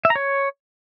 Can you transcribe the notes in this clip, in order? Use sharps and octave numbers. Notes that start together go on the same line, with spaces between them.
E5
A#5
C#5